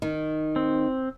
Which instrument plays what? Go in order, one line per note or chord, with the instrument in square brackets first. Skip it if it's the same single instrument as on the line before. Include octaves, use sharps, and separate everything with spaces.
[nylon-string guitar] D#3
[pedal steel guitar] C4